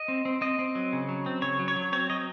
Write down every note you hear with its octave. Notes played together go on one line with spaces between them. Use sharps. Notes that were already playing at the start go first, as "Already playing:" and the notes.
Already playing: D#5
C4
C4
C4 D#5
C4
F#3
C#3
F#3
C4
C#3 C#5
F#3
C#5
F#3
C4 C#5
F#3 D#5